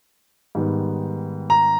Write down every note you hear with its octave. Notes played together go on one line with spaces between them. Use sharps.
G#2 D#3 G3 B3
A#5